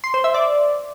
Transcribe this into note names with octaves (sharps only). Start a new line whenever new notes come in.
C6
C5
E5
D5